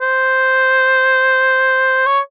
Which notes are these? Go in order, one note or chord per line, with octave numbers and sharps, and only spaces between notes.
C5
C#5